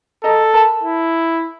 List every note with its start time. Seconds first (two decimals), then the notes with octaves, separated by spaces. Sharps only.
0.24 G#4 A4 D#5 A#5
0.53 A#4 A5 B5
0.83 E4